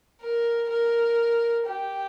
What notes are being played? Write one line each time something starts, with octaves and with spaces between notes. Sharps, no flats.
A#4
A#4
G4